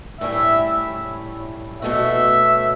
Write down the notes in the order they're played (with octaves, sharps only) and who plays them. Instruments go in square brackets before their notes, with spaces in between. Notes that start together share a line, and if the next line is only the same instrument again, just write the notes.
[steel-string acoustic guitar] A2 G3 C#4 E4 [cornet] E5
[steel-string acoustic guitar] B2 A3 C#4 F#4 [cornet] E5